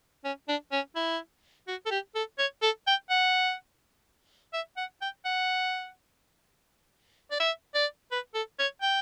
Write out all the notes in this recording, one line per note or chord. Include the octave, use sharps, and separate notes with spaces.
C#4
D4
C#4
E4
F#4
A4
G4
A4
C#5
A4
G5
F#5
E5
F#5
G5
F#5
D5
E5
D5
B4
A4
C#5
G5